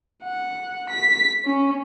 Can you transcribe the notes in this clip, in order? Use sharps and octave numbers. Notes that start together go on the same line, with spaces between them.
F#5
B6
C#4